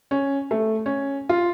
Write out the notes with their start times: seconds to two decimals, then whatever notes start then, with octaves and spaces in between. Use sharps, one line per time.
0.11 C#4
0.51 A3
0.86 C#4
1.29 F4